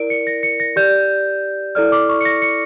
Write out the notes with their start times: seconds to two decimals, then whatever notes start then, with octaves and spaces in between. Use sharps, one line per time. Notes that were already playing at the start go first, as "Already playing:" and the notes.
Already playing: E4 A#4 D5 D7
0.10 C#7
0.27 A#6
0.43 C#7
0.60 A#6
0.76 G4 D5 G6
1.75 E4 A4 D5 F6
1.92 D6
2.09 C#6
2.21 C#7
2.25 A#6
2.42 C#7